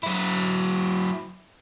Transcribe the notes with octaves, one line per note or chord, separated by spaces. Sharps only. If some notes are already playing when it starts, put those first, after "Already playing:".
F#3 E4